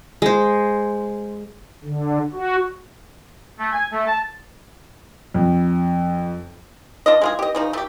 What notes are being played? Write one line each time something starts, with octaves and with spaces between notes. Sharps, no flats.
G#3 C5
D3
F#4
A3
G#5
A3
A5
F2
D4 F4 D#5
G#3 F4 G#4
G4 D#5
C#3 F3 D#4
A3 G4